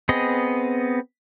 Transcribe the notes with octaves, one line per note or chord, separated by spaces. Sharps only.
B3 C4 G#4 D#5